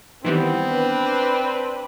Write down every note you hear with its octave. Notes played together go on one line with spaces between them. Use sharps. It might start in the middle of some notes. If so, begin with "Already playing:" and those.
D#3 E3 G3 B3 C4
D4 B4